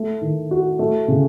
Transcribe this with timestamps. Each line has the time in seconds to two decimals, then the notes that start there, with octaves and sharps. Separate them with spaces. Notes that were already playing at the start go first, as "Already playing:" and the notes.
Already playing: A3
0.21 D#3
0.51 F#4
0.79 A3
1.08 C#3